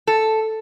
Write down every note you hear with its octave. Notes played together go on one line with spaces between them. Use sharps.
A4